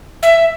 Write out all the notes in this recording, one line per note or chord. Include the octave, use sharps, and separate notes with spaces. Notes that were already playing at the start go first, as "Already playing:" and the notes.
E5